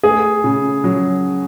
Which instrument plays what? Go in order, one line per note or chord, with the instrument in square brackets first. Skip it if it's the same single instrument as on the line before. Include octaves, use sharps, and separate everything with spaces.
[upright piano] A3 [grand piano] G#4
[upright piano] C#3
F#3